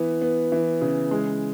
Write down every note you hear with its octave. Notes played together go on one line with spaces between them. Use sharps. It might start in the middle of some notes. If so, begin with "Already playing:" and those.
Already playing: E3 B3
B3
E3
C#3
G#3